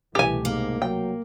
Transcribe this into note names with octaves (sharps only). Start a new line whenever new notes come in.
C2 B2 E3 A3 G4 G#5
G#2 A#3
F#3 G5